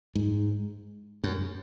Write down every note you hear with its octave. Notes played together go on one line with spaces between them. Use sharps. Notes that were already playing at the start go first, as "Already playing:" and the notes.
G#2
F#2